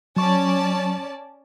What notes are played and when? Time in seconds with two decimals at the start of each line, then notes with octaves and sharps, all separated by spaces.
0.17 F#3 C#4 D5 A5 C#6